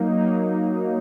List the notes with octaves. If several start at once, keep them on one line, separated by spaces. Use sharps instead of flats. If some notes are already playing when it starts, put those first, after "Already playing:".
Already playing: F#3 A#3 D#4
F#3 A#3 D#4